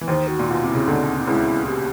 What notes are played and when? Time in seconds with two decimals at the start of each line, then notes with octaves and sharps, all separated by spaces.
0.01 E3
0.07 D#2 D#3 C5
0.28 F#4
0.39 A#2
0.48 B2 F4
0.63 C3 E4
0.75 C#3
0.87 D2 D3 D#4
1.19 D#4
1.27 C#2 C#3 E4
1.68 G4